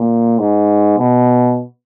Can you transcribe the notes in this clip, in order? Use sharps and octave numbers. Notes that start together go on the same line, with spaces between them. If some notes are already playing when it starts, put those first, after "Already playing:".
Already playing: A#2
G#2
B2